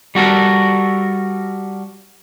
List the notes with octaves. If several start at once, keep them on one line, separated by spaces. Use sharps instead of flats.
G3 F#4 A4 A#4